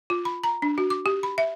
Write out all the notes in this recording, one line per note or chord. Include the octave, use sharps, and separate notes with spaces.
F4
B5
A#5
D4
F#4
D6
G4
B5
E5